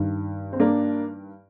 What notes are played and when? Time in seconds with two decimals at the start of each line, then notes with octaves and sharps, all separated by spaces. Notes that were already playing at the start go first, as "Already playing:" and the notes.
Already playing: G2 D#3
0.53 C4
0.60 A#3 D4